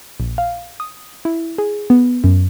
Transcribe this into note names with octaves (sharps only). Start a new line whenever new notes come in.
A#1
F5
D#6
E4
G#4
B3
F#2